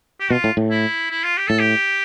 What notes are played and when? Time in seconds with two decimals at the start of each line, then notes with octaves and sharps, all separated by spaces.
0.20 G4
0.30 B2 F4
0.44 A2
0.57 A2
0.71 E4
1.10 E4
1.24 F4
1.37 G4
1.48 A2 A4
1.59 G4